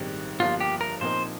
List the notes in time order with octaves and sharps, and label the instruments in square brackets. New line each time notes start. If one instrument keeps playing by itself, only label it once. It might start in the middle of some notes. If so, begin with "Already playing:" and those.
Already playing: [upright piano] A#1 G#2 D#3 G3 C4
[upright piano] G1 G2 F3 A#3 [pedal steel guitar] F4
[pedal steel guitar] G4
A#4
[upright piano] A#2 F3 C4 D#4 A#4 [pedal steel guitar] C5